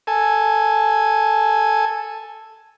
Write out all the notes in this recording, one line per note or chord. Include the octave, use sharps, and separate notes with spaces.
A4 G#5